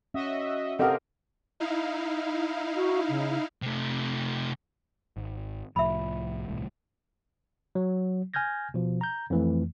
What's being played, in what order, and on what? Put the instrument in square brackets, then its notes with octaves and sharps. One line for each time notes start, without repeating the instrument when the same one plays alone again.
[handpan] C#4 [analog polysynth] F#4 D#5 E5
[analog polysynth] C3 [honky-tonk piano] C4 G4 A#4 [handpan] A4 D#5 F5 [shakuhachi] F#5
[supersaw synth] D#4 E4 F5
[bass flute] F#4
C#3
[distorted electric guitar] C3 A3
[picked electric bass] G#1
[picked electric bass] C2 A2 F3 [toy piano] E5 B5
[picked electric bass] D#1 C2 A2
[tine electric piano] F#3
G#5 F6 G6 G#6 A#6
B2 F3
A#5 G6
F2 E3 A3